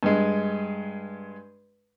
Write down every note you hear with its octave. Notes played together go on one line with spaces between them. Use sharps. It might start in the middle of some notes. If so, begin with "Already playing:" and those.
G2 G#3